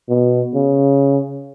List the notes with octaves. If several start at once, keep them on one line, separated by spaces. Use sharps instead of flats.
B2
C#3